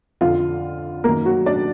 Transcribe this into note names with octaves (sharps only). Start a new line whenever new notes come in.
F2 D3 F4 F5
F#2 D#3 A#3 A#4
F#3 F#4
D4 D5